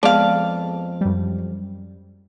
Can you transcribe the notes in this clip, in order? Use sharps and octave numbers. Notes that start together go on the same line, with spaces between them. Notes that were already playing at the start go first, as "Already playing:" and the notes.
F2 G#3 B3 D5 F5 A5
F#2 G3